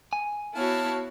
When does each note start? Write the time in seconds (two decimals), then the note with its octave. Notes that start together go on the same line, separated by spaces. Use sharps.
0.13 G#5
0.55 B3 E4 F#4 C#5 F5 A5